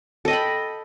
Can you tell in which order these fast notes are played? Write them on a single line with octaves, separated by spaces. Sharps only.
A4 D#5 G5 B5